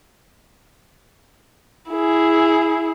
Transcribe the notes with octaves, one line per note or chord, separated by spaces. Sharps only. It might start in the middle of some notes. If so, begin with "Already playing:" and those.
E4 G#4